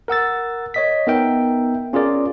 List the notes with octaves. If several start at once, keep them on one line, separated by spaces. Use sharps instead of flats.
A#4 F#5 E6 A6
C#5 D#5 B6
B3 D#4 A#4 E5 G5
C#4 F4 G#4 A#4 D5